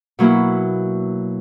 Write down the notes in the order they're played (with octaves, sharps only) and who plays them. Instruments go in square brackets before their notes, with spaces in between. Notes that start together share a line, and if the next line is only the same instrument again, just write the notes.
[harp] B2 F#3 A#3 E4